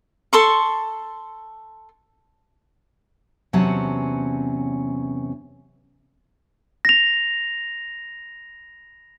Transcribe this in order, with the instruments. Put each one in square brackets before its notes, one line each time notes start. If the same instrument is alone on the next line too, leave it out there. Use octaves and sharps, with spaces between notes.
[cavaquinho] A4 C6 C#6
[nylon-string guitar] E2 C3 F#3 C#4 F#5 A5
[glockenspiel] A#6 F7